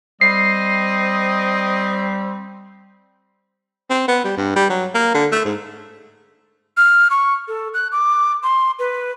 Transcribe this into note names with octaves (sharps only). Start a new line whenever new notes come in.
G3 C4 D#5 C7
C4
B3
G3
G2
G3
F#3
A#3
D3
A3
G#2
F6
C#6
A4
F#6
D6
C6
B4